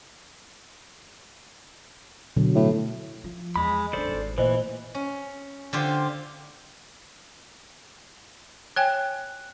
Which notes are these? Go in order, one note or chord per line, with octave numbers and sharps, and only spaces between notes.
B2 D3 F#3
A2
F3
E2 G#3 B5
D#3 D4 A4 C5 D5
G#1 G#2
A#2 E3 A3 C5 D#5
C#4
D3 F4 G4 C5
C#5 G5 G#5 F#6